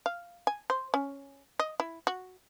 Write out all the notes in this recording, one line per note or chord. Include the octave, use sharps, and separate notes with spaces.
F5
G#5
C5
C#4
D#5
E4
F#4